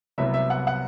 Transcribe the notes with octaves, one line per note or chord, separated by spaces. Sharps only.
C2 C3 F#3 B3 E5
E5
F#5
F#5